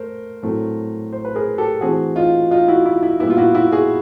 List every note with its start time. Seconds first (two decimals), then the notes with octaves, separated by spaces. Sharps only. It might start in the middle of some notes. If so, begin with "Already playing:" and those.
Already playing: A3 A#4 C5
0.43 A2 F#3 A3 C4
1.13 C5
1.25 B4
1.35 G#4 A#4
1.58 G4 A4
1.81 E3 A3 C4 F#4 G#4
2.16 D#4 F4
2.51 D#4 F4
2.68 E4 F#4
2.85 E4
3.03 E4
3.20 A#2 G3 B3 E4
3.30 F4
3.37 E4 F#4
3.54 E4 F#4
3.72 F#4 G#4